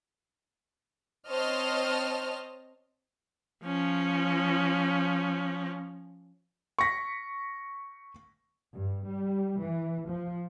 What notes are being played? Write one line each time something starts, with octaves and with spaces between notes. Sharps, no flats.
C4 C5 C#5 D#5 A5 F6
F3 C#4
C#6 A#6 B6
G2
G3
E3
F3